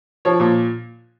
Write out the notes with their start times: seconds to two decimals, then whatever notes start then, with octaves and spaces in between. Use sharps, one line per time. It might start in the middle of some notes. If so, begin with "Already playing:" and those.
0.25 F3 C#5
0.40 A#2